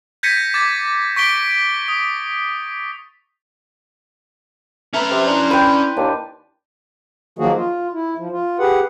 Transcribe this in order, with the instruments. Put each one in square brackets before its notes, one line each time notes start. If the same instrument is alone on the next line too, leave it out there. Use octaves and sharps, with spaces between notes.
[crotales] G6 G#6 A#6 B6 C#7 D#7
D6 A6
C#6 B6 D7 G7
D#6
[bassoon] A3 [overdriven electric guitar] C#4 A#5 [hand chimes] B4 B5 F6
[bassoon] C3
[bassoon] D4 [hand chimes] E4 C6
[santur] B4 G5
[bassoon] D#2 [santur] D4
[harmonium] D#3 F3 F#3 A#3 F#4 G#4
F4
E4
F3
F4
G4 G#4 B4 F#5